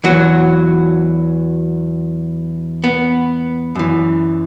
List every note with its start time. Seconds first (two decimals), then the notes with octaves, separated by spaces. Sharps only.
0.04 E2 E3 F#3 F#4
2.84 B3
3.75 F#2 E3